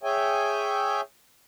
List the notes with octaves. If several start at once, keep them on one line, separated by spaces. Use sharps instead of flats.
G#4 C#5 E5 G5 G#5